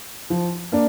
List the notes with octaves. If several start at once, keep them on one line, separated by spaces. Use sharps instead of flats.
F3
A#3 D4